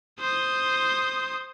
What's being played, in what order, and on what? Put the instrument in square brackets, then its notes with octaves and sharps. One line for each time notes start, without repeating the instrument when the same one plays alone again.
[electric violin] C5 D#6